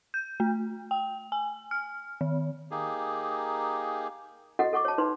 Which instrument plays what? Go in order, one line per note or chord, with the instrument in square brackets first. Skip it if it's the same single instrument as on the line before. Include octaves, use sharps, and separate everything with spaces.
[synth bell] G6
A3
G5
G#5
F6
D#3
[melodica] A#3 D#4 G4 G#4
[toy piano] F#4 A4 D#5 F#5
A4 F#5 C#6 D6
C#5 A5
D#4 B4 C6